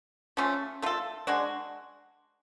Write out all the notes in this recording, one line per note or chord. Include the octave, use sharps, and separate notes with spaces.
F3 A3 C#4 F4
A3 F4 A4
G#3 D4 F#4